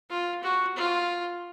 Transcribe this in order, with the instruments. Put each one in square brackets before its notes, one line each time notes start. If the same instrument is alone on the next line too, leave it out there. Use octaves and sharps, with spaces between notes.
[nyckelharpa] F4
F#4
F4